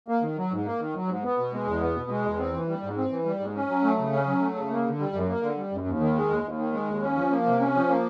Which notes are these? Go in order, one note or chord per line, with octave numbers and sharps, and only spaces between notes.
A#3
D#3
F#3
G#2
A#3
D#3
F#3
G#2
B3
B2
G#3
E2
B3
B2
G#3
E2
C4
E3
G3
G#2
C4
E3
G3
G#2
C#4
F#3
A3
C#3
C#4
F#3
A3
C#3
A#3
D3
G3
F#2
A#3
D3
G3
F#2
D#2
D#3
G#3
D#2
D#2
D#3
G#3
D#2
C#4
F3
A#3
C3
C#4
F3
A#3